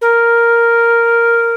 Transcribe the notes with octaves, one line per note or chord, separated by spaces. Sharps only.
A#4